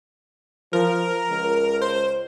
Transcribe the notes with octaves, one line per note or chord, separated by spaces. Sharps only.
F3 A#4
C#2
C5